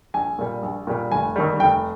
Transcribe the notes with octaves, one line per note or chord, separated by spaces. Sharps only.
A#1 G#5
A#2 G3
A#1
A#2 G3
F1 G#5
D#2 D#3 G3
F1 G5